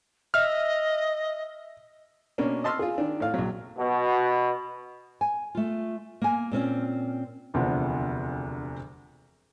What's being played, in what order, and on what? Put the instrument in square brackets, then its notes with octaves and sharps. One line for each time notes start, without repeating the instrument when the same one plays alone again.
[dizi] D#5 [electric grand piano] E5 F6
[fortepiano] B2 A#3 C#4 D4
D#5 A5 C6 E6 F6
F4 G#4
D#3 D4
A2 F5
A#1 F#3
[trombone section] B2
[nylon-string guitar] G#5
A3 F4
A#3 G#5
A#2 C4 C#4 F4
[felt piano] E1 D2 C3 F3 B3 D4